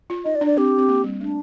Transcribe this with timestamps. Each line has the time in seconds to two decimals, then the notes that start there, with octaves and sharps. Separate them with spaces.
0.10 F4
0.25 D#4 D#5
0.35 D5
0.41 D4
0.47 D5
0.57 C4 G4
0.78 C4
0.88 A#3
1.04 G3
1.20 A3 D4